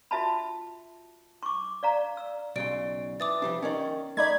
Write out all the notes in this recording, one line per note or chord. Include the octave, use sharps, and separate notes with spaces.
F4 F#4 E5 A5 B5
C#6 D6
D5 F5 A#5
E6
B1 C#3 D5 C6 D7
E3 D6 D#6 A6
F3 G3 D4
D#3 C#4 D#4 D5
A3 D#4 D5 B5 G#6